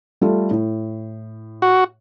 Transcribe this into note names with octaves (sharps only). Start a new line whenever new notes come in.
G3 A3 F4
A2
F#4